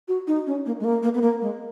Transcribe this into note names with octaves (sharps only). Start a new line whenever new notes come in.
F#4
D#4
C#4
A#3
G#3
A#3
A#3
B3
A#3
G#3